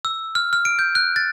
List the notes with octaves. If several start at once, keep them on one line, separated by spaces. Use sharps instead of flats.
E6
F6
F6
D7
G6
F#6
A6